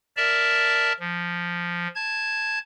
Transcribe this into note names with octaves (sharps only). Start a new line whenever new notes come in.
A#4 D5 E5 A5
F3
A5 G#6